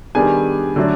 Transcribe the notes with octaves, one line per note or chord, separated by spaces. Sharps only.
D#3 G3 B3 D4 G#4 G#5
D3 F#3 A3 D4